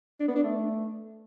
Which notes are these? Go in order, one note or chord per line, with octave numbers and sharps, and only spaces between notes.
D4
B3
D4
A3